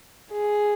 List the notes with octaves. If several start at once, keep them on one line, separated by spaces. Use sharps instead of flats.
G#4